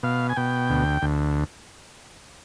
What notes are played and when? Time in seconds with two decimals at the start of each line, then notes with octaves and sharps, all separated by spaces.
0.03 B2 F5
0.29 G#5
0.36 B2 G5
0.70 D2
1.02 D2